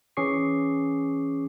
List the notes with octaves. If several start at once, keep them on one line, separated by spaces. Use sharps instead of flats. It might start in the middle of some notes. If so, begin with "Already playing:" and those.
E3 C#4 G#4 C#6 D6 C7